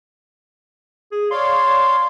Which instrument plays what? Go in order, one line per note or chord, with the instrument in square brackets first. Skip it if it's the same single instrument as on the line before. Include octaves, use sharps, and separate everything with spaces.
[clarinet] G#4
[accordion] C#5 D5 F5 [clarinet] C6